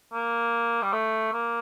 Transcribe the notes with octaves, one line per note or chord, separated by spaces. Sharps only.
A#3
G3
A3
A#3